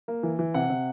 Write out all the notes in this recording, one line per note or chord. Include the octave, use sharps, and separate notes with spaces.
A#3
E3
E3
C3 F#5
C3